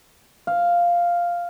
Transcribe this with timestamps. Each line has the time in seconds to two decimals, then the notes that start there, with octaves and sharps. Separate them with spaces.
0.47 F5